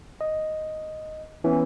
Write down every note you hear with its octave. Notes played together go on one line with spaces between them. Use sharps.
D#5
E3 B3 C#4